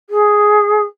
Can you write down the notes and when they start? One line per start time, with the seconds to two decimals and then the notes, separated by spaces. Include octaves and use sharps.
0.09 G#4